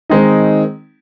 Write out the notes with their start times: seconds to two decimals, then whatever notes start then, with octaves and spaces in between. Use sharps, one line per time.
0.10 D#3 G#3 C4 D#4